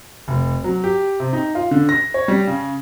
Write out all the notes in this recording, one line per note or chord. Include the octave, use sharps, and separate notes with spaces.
F1
F#3
G4
C3
D#4
F4
D3
A#6
C#5
G3
C#3